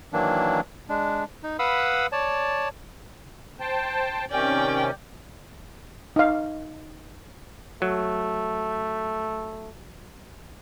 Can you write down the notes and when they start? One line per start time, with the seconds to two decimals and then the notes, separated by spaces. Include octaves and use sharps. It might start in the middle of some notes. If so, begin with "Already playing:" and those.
0.13 D#3 E3 F#3 A#3 D4
0.89 G#3 D4
1.43 D#4
1.59 B4 F5 F#5 B5 D#6 E6
2.12 C#5 D5 A5
3.60 C5 G5 A5
4.31 C3 D#3 C#4 D5 G5
6.16 D#4 F5
7.82 F#3 A3